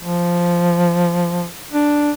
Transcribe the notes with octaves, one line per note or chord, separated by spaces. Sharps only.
F3
D4